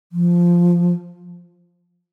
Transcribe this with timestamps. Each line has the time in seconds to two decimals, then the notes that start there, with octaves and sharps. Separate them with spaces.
0.12 F3